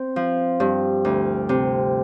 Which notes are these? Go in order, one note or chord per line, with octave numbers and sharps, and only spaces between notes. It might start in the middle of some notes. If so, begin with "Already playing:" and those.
Already playing: C4
F3
G2
D2
C3